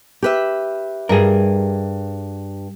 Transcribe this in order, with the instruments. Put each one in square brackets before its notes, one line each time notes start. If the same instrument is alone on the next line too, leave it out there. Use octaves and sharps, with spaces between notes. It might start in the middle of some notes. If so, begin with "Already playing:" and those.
[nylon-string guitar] G4 B4 E5
[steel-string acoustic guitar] G2 [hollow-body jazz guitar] G#4 A#4